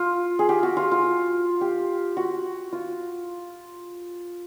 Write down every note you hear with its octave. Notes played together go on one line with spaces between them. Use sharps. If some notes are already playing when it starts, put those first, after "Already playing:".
Already playing: F4
G#4
G4
F#4
F4
F4
G4
F#4
F4